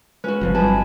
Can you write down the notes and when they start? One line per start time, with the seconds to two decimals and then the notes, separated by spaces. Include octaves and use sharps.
0.24 G#3 C#4 F4 F#4 B4
0.41 G1 C2 C3 F3 C4
0.55 F#3 G3 E4 B4 D#5 G#5 A5 B5